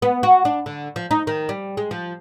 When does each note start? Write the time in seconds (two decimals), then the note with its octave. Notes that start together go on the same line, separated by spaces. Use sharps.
0.02 B3
0.23 F#4
0.45 D4
0.66 D3
0.96 F3
1.11 D#4
1.27 D#3
1.49 G3
1.77 G#3
1.91 F3